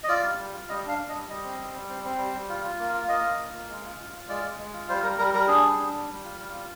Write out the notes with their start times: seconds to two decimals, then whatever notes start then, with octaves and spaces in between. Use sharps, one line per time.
0.04 D#5
0.08 F4 D5
0.23 G3
0.38 G3
0.53 F4
0.69 G3 D#5
0.84 D4 F5
0.99 D4
1.09 D#5
1.14 G3
1.29 G3 D#5
1.44 C4
1.58 G3
1.73 G3
1.89 C4
2.04 C4
2.18 G3
2.34 G3
2.49 F4
2.64 F4
2.79 A#3
2.93 F4
3.08 A#3 D#5
3.24 A#3
3.39 F4
3.53 A#3
3.69 G#3
3.84 F4
3.98 F4
4.13 F4
4.29 G#3 D5
4.44 G#3
4.59 G#3
4.73 F4
4.89 G3 C5
5.04 G3 A#4
5.18 G3 A#4
5.34 G3 A#4
5.48 D4 G#4
5.63 G3
5.79 D4
5.93 G3
6.09 G3
6.23 F4
6.39 G3
6.54 F4